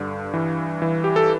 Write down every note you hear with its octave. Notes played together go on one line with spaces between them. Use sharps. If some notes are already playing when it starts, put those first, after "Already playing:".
Already playing: G2 D3
E3
E3
G4
A4